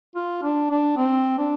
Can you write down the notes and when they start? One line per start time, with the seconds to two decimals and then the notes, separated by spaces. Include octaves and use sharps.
0.15 F4
0.43 D4
0.70 D4
0.97 C4
1.38 D4